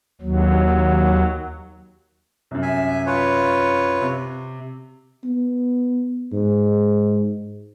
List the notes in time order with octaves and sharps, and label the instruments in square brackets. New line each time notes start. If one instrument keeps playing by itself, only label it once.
[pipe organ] D#2 F#3
[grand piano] C2 F#2
[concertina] E5 G#5
F4 B4 C#5
[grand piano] C3
[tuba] B3
G#2